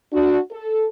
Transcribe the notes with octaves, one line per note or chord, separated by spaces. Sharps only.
D4 F#4
A4